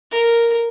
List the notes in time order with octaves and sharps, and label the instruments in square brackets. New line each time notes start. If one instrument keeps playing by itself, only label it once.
[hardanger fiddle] A#4